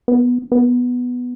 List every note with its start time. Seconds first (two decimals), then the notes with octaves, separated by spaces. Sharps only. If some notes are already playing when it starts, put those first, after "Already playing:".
0.08 B3
0.52 B3